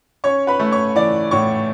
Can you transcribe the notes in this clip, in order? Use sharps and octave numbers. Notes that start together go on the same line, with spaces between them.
C#4 C#5 C#6
B4 B5
A3
C#5 C#6
E3 D5 D6
A2 C#5 C#6